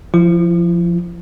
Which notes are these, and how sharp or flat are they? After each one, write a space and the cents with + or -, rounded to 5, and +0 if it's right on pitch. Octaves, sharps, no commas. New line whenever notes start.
F3 -5 E4 +40